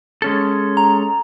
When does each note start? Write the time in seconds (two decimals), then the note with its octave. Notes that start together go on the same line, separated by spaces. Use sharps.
0.22 G#3 C#4 A4
0.77 A#5